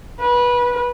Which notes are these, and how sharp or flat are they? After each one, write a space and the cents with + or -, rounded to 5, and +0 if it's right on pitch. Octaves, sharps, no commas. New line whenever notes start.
B4 -20